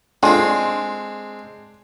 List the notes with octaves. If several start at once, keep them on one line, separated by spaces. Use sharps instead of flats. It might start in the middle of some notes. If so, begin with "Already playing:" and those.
G#3 C4 D4 F4 A4 G#5